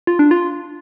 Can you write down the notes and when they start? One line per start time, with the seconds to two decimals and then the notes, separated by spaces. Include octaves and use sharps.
0.07 F4
0.19 D4
0.31 F4